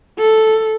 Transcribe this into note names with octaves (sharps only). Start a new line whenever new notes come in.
A4